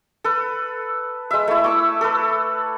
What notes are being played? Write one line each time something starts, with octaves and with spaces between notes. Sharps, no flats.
A4 B4
G#3 E5
A3 E4
C#6 D6 E6
A4 B4